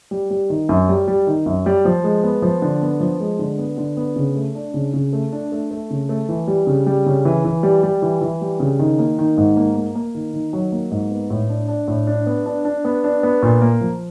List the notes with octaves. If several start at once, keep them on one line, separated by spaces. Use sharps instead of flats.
G3
G3
D#3
F#2
G3
G3
D#3
F#2
G3
F3
G#3
B3
F3
D3
B3
F3
G#3
D3
B3
D3
B3
C#3
A3
D4
C#3
C#3
A3
D4
A3
A3
C#3
A3
E3
G3
C#3
G3
C#3
E3
E3
G3
G3
E3
E3
G3
C#3
D#3
A#3
D#3
G#2
A#3
A#3
A#3
D#3
D#3
F#3
A#3
G#2
B3
A2
D4
D4
A2
D4
B3
D4
D4
B3
D4
B3
A#2
A#3
F3